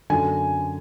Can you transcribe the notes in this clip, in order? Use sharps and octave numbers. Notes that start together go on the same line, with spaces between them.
F#2 D3 G#5